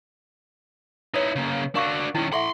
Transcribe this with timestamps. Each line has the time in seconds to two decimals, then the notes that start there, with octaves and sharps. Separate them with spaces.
1.14 D#4 E4 B4 C#5
1.36 C#3 A#3
1.75 D4 F#4 A#4 F5 C#6
2.15 D#3 C#4 E4
2.33 A4 E5 F#5 B5 C6